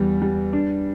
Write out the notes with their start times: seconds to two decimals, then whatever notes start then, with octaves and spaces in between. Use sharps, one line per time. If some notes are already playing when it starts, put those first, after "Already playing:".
Already playing: E2 G3
0.22 G3
0.53 D4